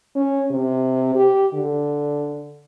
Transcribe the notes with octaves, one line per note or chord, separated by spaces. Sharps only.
C#4
C3
G4
D3